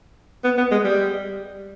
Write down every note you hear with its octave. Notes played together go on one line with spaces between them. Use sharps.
B3
B3
G#3
G3